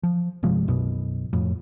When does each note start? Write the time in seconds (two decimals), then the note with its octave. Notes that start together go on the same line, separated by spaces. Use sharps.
0.03 F3
0.43 G1 C3 F3 G#3
0.68 B1 F#2 B2
1.33 F2 A2